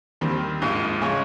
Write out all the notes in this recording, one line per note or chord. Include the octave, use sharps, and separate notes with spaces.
D#2 D#3 G3 C4
A#1 G#2 F3 G#3
C#3 G#3 D#4 G#4 C#5